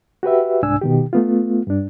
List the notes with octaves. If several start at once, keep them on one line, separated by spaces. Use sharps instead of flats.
F#4 G4 B4 E5
C2 G#2 D4 G#5 E6
B2 D#3 G4
A3 B3 F4
G2 D4